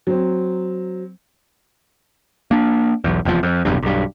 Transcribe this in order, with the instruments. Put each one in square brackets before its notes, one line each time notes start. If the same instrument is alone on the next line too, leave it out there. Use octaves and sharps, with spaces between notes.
[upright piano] F#3 C4
[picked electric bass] A#3 D4
B1 E2
F1 E2 G#2 F3
F2
F1 B1 E2 G2
B1 G2